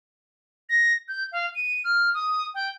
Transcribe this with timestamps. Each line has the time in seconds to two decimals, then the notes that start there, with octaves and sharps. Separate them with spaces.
0.69 A#6
1.08 G6
1.32 F5
1.55 D#7
1.84 F6
2.14 D#6
2.54 G5